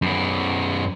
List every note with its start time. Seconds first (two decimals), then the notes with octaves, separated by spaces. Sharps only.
0.02 F#2 B3